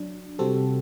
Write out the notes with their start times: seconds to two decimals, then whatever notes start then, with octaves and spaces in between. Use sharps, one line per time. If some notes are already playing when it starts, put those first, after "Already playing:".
Already playing: F#3 D4
0.39 C3 G3 C4 F#4 A4